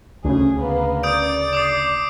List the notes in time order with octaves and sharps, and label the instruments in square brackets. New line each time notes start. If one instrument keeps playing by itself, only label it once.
[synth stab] D2 C#3 [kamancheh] G#4
[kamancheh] A#3 B3
[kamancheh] D5 [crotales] D#6 G6 D7
[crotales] D6 D#6 C7